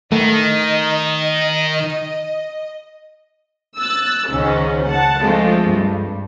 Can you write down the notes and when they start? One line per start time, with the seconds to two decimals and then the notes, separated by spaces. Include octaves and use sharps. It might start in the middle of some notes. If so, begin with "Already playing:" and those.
0.12 D#3 A3 D#5
3.77 E6 F#6 A6
4.30 C#2 G#2 D#3 C#4
4.88 F#5 A5
5.21 F3 G#3 A3 C4 D4 F4
5.69 G2